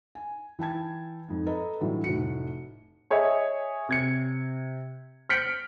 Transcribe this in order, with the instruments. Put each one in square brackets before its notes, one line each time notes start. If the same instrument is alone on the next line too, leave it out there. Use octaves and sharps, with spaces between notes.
[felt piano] G#5
E3 G5 A5 G#6
F2 G#2
A4 B4 D#5 A#5
A2 D3 E3 F#3 G3
F1 A2 F#4 C#7
[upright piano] G#4 C#5 D#5 E5 G#5
C3 G#6 C#7
F6 G6 B6 C#7 D7 F#7